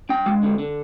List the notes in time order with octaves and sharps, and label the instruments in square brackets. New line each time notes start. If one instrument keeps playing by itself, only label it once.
[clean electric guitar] D4 G5
G#3
D3
D3